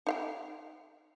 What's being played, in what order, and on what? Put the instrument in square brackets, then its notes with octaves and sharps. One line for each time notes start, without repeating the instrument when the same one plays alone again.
[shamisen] D#4 F5 G5